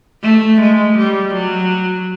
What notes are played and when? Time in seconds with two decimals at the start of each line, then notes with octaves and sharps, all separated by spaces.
0.23 A3
0.61 G#3
0.97 G3
1.34 F#3